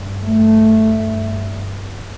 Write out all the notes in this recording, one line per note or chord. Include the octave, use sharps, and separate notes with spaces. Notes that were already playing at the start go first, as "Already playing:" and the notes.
Already playing: G2
A3
G2